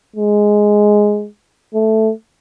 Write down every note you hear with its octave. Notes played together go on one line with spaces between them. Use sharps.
G#3
A3